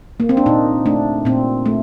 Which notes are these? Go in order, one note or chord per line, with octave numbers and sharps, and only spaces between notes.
A#3
C4
D4
A#2 D#4
A3 D4
A#2 C4
A3